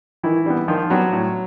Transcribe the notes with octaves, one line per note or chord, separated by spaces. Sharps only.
D#3 E3 E4
G3 B3
D#3 F3 F4
F#3 G3 B3 F#4
A2